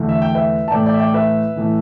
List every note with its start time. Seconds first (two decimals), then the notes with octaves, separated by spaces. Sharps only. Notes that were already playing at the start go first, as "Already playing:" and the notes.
Already playing: E2 D3 A3
0.09 E5
0.22 G5
0.35 B4 E5
0.68 A5
0.71 A2 E3 A3 D5 G5
0.86 D5 G5
0.94 E5
1.00 D5 G5
1.14 B4 E5
1.56 A2 E3 A3